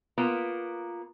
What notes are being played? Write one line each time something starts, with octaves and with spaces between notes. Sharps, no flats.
A#3 B3 F4 A#4 B4